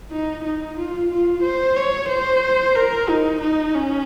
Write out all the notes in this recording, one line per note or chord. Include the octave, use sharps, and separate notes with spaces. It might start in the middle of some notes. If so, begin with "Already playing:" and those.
D#4
D#4
F4
F4
C5
C#5
C5
A#4
D#4
D#4
C#4